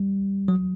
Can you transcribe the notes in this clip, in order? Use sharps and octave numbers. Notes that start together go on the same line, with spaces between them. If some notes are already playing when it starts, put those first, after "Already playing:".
Already playing: G3
F#3